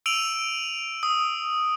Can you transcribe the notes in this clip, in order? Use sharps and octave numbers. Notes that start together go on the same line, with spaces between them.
E6 D7 D#7 F7 F#7
D#6